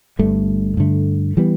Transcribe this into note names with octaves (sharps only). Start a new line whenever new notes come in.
G1 G2 D3 A3
G2 D3 A3
E3 G3 B3